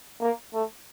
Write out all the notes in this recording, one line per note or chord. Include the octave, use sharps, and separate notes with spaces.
A#3
A3